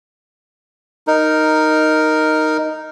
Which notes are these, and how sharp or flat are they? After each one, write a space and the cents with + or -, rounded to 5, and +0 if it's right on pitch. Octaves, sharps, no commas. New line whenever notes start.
D#4 +0 A#4 +0